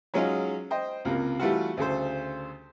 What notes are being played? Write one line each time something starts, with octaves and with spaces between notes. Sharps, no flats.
F#3 G#3 C#4 D#4 F4
C5 D#5 G5
C#2 C3 A#3
E3 G3 A3 F4 F#4
D2 C#3 A4 C5